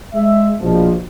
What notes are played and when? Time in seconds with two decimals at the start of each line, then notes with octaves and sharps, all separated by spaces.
0.14 G#3 E5
0.60 A#1 B2 F3